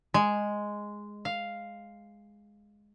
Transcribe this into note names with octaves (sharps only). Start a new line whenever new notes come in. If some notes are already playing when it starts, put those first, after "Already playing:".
G#3
F5